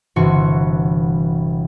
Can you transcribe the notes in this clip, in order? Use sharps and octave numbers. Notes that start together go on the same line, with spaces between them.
G1 C3 E3 F#4 C#6 C#7